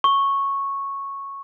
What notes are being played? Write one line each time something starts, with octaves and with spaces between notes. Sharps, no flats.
C#6